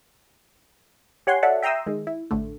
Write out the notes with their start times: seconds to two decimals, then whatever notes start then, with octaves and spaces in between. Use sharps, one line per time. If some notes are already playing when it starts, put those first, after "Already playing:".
1.27 G4 C#5 F#5 G#5 C6
1.43 F#4 A4 C#5 D5 E5 F#5
1.63 E5 G5 A#5 C6 D#6 E6
1.86 D#3 G#3
2.07 E4
2.31 A1 A2 D3 A3